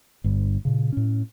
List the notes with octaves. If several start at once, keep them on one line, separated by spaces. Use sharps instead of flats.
G1 G2
A#2 C#3
A2 C#4